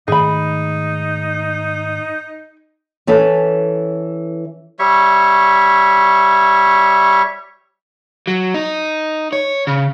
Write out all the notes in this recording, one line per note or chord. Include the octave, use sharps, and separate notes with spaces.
G#2 D#3 A3 D#4 G#4 B5
E3 C#4 A4 B4
G3 C#5 E5 C#6
F#3
D#4
C#5
C#3